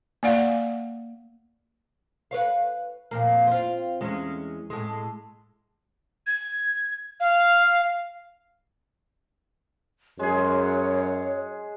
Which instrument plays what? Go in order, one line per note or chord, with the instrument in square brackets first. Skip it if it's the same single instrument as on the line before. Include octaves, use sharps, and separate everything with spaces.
[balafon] A#3 D5 F5 F#5
[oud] B4 C#5 F5
F2 A#2 A#3
C4 F4
E2 G#3 C#4
A2 G#3
[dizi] G#6
F5
[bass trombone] F#2 [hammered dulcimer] G#3 G#4 [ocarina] C#5